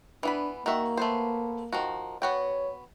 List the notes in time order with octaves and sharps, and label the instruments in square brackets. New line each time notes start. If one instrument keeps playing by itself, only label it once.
[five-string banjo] E3 B3 B5 [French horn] D4
[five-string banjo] D#3 F#4 E5 [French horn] A#3
[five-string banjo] A3 B3 C5
D#3 F3 F#4
[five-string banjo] B3 F#4 G5 [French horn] C#5